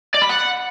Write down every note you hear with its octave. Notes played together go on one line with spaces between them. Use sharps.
D5
B5
F#5